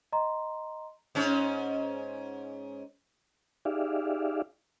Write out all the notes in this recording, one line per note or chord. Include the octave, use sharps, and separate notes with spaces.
D#5 A#5 C6
G#2 C#4
D#4 G4 G#4 D5 E5 F5